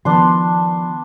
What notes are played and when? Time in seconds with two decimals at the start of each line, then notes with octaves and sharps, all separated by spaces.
0.05 D#3 F3 B3 D4 C6